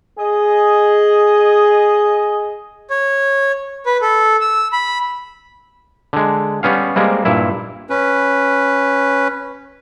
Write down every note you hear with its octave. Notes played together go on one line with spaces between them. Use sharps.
G#4 D#5
C#5
B4
A4
E6
B5
D3 G#3
G3 B3 C#4 F5
G3 G#3 A#3 C4
G2 A#2 E4
C#4 B4